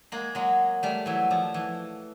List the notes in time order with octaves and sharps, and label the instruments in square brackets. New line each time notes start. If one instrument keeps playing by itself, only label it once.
[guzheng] G#3 A#3
F#3 G#3
G3 A3
E3 F#3
F3
E3